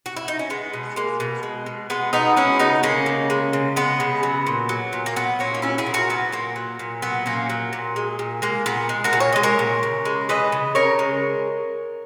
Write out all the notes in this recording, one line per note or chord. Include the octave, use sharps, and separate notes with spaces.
F#4
E4
D#4
C#4
G#3 B3
B2
G#3 A#3
B2
G#3
B2
G#3 B3
B2 B3 D#4
G#3 C#4 E4
C#3 B3 D#4
G#3 A#3 C#4
C#3
G#3
C#3
G#3 B3
C#3
F#3
A#2
F#3
A#2
A#3
F#3 B3
A#2 A#3 C#4
D#4
F#3 C#4 E4
E4 G#4
A#2
F#4 A#4
F#3 B3
A#2 A#3
F#3
A#2
F#3 B3
A#2 A#3 C#4
F#3
A#2
G#3
A#2
G#3 A#3
A#2 B3
G#3
F#4 A#4
A#2
C#5
G#3 D#5
A#4 C#5
A#2
C#3
G#3
E3 B4 D#5
C#3
C#3 A#4 C#5
G#3